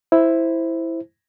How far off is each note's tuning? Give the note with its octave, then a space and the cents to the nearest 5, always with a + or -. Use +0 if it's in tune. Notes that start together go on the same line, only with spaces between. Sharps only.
E4 +0 C5 +0